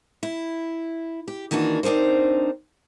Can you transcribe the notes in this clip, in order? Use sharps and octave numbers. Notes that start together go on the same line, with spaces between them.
E4
G4
D#3 E3 A#3 D4 F#4
C4 D4 D#4 A#4 C5